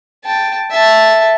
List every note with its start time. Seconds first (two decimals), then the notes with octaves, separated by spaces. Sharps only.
0.25 G5 A5
0.71 E5 A5